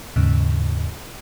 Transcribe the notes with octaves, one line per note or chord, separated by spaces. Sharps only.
D#2 G#2 C#3